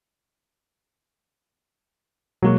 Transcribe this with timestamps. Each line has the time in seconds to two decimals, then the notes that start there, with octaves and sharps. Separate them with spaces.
2.42 B2 F#3 G#3 A#3 F#4